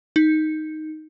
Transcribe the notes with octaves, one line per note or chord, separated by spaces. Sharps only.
D#4